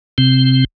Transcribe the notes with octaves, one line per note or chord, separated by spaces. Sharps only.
C3 C4